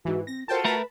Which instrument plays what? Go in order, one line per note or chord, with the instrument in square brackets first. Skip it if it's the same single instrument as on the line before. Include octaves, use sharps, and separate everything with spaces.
[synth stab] G#2 E3 [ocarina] F#4
[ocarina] C4 [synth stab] A#6
[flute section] F4 F#4 A4 [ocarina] A#4 [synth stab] C5 G5 A5
[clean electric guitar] A3 A#4 [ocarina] B4 [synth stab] A5 B5